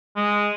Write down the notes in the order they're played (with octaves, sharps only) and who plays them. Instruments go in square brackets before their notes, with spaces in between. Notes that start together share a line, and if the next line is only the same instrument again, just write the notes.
[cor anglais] G#3